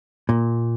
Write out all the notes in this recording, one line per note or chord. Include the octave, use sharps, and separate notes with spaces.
A#2